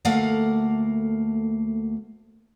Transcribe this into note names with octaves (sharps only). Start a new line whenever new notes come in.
D2 A3 A#3 F5 F#5